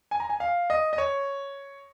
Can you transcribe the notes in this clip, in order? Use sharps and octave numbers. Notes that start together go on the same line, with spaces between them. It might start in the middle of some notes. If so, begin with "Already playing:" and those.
G#5
A#5
G#5
F5
D#5
D#5
C#5